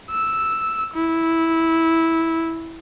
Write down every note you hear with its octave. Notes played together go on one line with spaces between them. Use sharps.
E6
E4